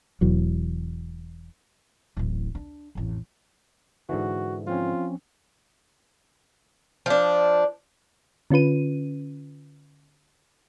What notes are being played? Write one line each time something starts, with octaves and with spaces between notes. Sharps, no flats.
E1 E2 E3 F#3
D1 A1
D4
A1 F2
G#2 D3 E3 F#4
F3 C4 C#4 F4
F3 D4
D3 C#4 F4 B4 D#7